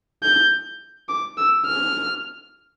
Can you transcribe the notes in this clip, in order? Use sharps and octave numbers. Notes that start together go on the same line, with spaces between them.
G6
D6
E6
F6